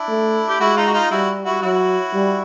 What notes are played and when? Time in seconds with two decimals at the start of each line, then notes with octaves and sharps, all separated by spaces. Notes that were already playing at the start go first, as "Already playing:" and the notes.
Already playing: D4 E4
0.08 A3
0.48 G4
0.60 G#3 E4 F#4
0.77 D#4 F4
0.87 F#4
0.94 D#4 F4
1.11 G3 E4 F#4
1.45 E4 F#4
1.62 F#3 E4 F#4
2.14 G3